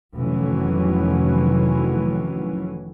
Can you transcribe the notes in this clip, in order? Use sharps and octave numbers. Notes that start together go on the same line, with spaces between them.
F1 A2 D#3 E3 F#3 C#4